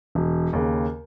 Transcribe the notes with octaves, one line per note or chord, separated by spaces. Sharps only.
E1
D#2 C#3